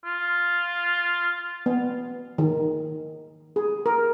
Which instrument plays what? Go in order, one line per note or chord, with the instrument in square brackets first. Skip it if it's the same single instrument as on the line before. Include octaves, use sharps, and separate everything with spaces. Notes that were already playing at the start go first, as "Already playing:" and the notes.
[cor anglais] F4
[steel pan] B3
D#3
G#4
A#4